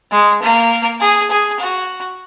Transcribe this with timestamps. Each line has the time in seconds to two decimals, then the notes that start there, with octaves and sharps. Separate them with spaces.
0.11 G#3
0.42 A#3
1.01 G#4
1.30 G#4
1.59 F#4